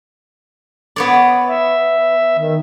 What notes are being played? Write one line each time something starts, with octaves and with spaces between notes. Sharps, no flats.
B3 C#5 D5
E5
D#3